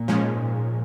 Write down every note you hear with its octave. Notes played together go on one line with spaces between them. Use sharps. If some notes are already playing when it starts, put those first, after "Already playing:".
Already playing: A#2
G#2 F3 G#3 C#4